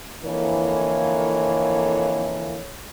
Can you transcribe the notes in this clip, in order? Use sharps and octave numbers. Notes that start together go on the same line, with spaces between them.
F2 D3 E3 A#3 C#5